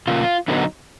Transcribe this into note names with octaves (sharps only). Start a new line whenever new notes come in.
C#3 F3 A#3 F4
D3 F#3 B3 D#4 E4